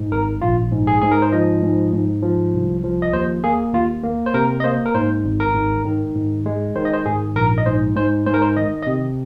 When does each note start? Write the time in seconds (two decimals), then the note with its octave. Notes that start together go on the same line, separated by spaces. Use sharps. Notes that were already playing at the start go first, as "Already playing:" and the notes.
Already playing: G#2
0.12 G#1 A#4
0.41 A#1 F4
0.72 G#2
0.87 G#4
1.01 G#2 G#4
1.11 A#4
1.22 C5
1.32 F3 D#5
1.63 G#2
1.93 G#2
2.23 F3
2.54 C2
2.84 F3
3.02 D#5
3.13 D#2 C5
3.44 A#3 G#4
3.73 D#2 F4
4.04 A#3
4.26 C5
4.34 C3 A#4
4.60 D#5
4.64 A#3 C5
4.86 A#4
4.95 G#2 C5
5.25 G#1
5.40 A#4
5.55 G#2
5.85 D#3
6.15 G#2
6.46 G#3
6.76 D#3 C5
6.85 D#5
6.93 C5
7.06 G#2 G#4
7.35 A#1 A#4
7.58 D#5
7.66 G#2 C5
7.96 G#2 C5
8.26 G#2 C5
8.34 A#4
8.42 C5
8.57 D#3 D#5
8.83 D#5
8.87 C3